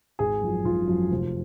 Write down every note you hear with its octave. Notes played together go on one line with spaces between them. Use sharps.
G#1 G#4
F#2 F3
G#1 F4
F#2 F3
F1